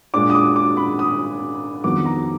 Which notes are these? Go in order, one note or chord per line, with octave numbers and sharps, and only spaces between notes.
A#2 G#3 D4 D6
D#6
D6
D6
B5
D#6
F2 D#3 F#3 B3 D6
A#5